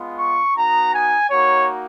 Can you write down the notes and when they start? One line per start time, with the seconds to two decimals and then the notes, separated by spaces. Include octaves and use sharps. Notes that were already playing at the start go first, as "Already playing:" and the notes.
Already playing: G#3 B3 F4
0.18 C#6
0.56 B3 D#4 F#4 A#5
0.93 G#5
1.30 A#3 D#4 F#4 C#5